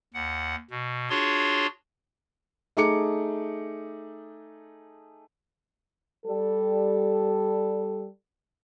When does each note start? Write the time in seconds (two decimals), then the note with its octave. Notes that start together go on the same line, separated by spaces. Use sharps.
0.14 D#2 F#5
0.70 B2
1.10 D4 F4 F#4 G#4 C#5 C6
2.77 A3 D#4 G#4 D6 C#7
6.26 G3 A4